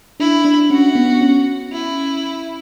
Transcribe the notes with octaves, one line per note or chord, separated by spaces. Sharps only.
D4 E4
D4
C#4 F#4
B3
C#4
E4